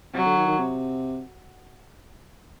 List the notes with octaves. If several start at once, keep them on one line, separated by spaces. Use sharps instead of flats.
C3 F#3
D3
D#3
D#3
C3